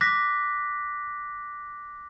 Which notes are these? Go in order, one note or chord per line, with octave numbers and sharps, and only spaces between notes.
D6 F#6 A#6 B6